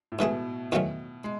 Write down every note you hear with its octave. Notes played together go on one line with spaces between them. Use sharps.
A2
G#2 B2 E3 A3 E4 G#4
E2 D#3 F#3 A3 C#4
G#3